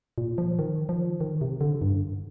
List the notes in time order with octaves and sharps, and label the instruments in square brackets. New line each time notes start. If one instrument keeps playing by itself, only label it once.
[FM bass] A#2
F3
D#3
F3
D#3
C3
D3
G2